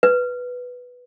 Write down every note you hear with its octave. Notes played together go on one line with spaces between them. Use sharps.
B4